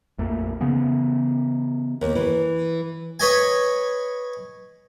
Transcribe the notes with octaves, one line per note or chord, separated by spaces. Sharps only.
A#1 F2 A3 A#3
C#3 E3 B3 C#4
D#2
E3
B4 C#5 D#5 G#5